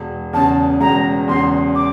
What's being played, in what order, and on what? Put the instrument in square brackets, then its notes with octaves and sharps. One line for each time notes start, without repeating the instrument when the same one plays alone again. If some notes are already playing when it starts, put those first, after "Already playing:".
Already playing: [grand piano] E1
[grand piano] E2 C#3 [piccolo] A5
[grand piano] E1 [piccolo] A#5
[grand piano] E2 C#3 [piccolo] C6
[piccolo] D6